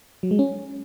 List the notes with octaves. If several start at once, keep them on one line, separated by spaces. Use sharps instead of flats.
F#3
G#3
C#4